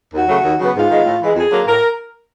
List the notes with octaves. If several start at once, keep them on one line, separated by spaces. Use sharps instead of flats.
D#2 F#4
C#3 F#3 A3
D#2
C#3 F#3 B3
G#2 F4
D#3 G#3 B3
A2
E3 G#3
F2 G#4
D3 F#3 A#3
A2 A#4